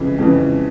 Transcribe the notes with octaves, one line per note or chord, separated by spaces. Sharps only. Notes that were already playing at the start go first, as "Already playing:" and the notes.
Already playing: F2 C#3 E3
F2 C#3 E3